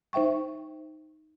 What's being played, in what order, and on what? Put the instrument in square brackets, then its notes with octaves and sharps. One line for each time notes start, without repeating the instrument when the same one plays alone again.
[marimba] D#4 C5 E5 G5 C#6